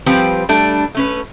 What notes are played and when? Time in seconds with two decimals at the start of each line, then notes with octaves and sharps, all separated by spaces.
0.06 F3 G3 C4 G4 B4
0.49 G3 A3 D4
0.95 A3 C#4 B4